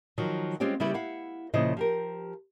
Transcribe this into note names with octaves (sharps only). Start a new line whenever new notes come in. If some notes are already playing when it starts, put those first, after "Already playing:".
D#3 F3 F#3
G3 G#3 C4 C#4 F4 G4
C#3 G3 B3 E4 G4 B4
E4 F5 F#5
A#2 C#3 F3 E4 C5 D#5
F3 G4 A#4